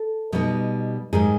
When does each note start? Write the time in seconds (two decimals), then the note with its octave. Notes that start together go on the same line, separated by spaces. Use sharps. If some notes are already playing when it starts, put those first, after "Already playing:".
Already playing: A4
0.32 B2 G3 B3 D#4
1.13 G#2 D#3 G3 G#4